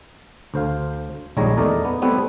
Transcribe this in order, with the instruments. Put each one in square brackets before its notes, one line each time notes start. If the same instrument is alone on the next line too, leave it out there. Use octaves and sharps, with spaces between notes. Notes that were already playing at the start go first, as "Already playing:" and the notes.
[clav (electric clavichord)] D2 C5 F5
A#1 D#2 G3 G#3 C#5 A#5
E2 A3 D#4 A#4 D5
B3
G3 A3 B3 C4 E4 B4